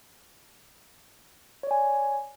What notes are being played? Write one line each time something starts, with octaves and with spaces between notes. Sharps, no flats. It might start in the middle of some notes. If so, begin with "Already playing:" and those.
C#5 D5 G#5